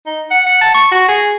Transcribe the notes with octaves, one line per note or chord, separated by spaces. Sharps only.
D#4
F#5
F#5
A5
C#6
F#4
G#4